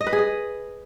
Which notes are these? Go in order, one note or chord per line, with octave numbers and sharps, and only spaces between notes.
D#5
B4
G#4
D#5